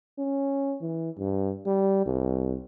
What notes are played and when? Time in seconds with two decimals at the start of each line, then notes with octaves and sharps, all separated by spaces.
0.19 C#4
0.82 E3
1.18 G2
1.66 G3
2.06 C2